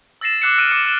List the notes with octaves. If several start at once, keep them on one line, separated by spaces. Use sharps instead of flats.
E6 A6 A#6 C7 E7
D6 E6 F#6 C7 C#7 E7
E6 F6 C7 D7 D#7
D6 C#7 D7
F6 G7